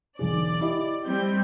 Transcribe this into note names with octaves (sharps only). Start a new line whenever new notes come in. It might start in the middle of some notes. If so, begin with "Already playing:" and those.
E1 B1 G#4 D5
E4 G4 D#5
G3 C4 G6